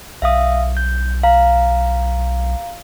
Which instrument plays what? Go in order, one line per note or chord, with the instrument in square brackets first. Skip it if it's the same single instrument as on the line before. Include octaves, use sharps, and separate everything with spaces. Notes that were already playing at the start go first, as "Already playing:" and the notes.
[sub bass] B1 [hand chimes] E5 F5 D#6
[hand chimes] G6
F5 A#5